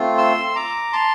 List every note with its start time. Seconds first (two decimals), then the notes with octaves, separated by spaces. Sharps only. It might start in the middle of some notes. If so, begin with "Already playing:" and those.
Already playing: A3 C4 F4
0.18 C6 E6
0.47 E6
0.55 A#5 D6
0.93 A5 C6